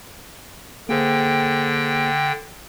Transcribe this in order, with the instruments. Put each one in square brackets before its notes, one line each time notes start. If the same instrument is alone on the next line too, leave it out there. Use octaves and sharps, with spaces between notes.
[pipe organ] D3 G5 [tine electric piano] A#3 G#4 C5